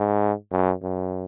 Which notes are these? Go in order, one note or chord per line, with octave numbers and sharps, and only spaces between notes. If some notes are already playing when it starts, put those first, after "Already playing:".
Already playing: G#2
F#2
F#2